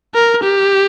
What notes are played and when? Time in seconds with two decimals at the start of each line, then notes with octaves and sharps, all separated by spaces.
0.14 A#4
0.43 G4